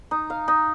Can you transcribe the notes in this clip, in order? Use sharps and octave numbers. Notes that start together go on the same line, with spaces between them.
D#4
F5
D#4